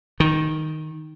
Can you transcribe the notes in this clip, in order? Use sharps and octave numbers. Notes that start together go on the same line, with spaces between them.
D#3